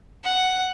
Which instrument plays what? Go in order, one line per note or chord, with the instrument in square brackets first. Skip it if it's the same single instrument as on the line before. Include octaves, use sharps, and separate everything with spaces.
[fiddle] F#5